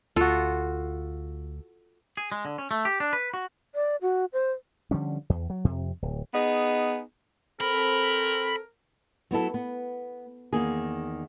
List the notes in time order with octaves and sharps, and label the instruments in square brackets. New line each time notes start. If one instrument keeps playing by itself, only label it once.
[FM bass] D2 [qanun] F4 [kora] F#4 A4
[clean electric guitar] G#4
G#3
D3
C#4
A3
G4
D4
B4
F#4
[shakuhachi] D5
F#4
C5
[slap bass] D3 F3 G3 C#4
E2
F#3
F2 C3
D1
[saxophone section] B3 D#4 G#4
[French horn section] C4 A4 [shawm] A#4 [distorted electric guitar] B5
[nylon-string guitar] F#3 B3 E4 A4
B3
E2 D#3 A#3 G#4